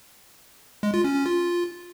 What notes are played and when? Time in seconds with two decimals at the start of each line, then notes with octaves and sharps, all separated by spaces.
0.83 G#3
0.94 F4
1.04 C#4
1.15 C#4
1.26 F4